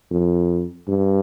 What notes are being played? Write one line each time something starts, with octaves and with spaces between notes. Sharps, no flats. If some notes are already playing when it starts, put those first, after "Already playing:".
F2
G2